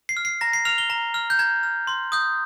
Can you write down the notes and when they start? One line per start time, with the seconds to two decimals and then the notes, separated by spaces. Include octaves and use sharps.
0.09 C7
0.17 F6
0.25 C7
0.41 A#5 A#6
0.53 C7
0.65 F6 F7
0.78 G7
0.90 A#5
1.14 F6
1.30 G6
1.39 A#5 G#6
1.63 F6
1.87 C6
2.12 D#6 G6